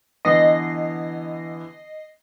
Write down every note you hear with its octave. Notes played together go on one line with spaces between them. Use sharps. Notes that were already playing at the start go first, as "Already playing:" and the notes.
D3 E3 B3 D#5 A#6 C7